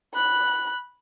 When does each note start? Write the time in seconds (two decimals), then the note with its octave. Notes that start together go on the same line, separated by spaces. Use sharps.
0.14 B5 F#6